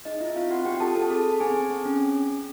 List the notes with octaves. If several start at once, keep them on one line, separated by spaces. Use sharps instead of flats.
D#4 G#4 D#5
E4 F4 E5
C4 F4 F5
C4 F#4 F#5
C4 G4 G5
F4 A4 A5
C4 A4 A5
G#4 A4 A5
G#4
C4 G#4 G#5
C4
C4
C#4
C#4
C#4
C#4